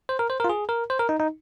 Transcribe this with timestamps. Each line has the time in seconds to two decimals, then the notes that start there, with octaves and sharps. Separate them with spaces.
0.09 C5
0.19 A#4
0.30 C5
0.40 A#4
0.44 F4
0.49 G#4
0.69 A#4
0.90 C5
0.99 A#4
1.09 D#4
1.20 D#4